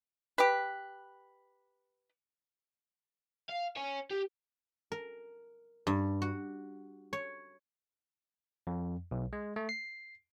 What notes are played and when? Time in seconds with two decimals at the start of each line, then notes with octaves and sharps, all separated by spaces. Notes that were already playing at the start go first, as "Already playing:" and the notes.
0.38 G4 B4
3.49 F5
3.76 C#5 G#5
4.11 G4
4.92 A#4
5.87 G2
6.22 F#4
7.13 C#5
8.67 F2
9.11 B1
9.33 G#3
9.56 A3
9.69 C7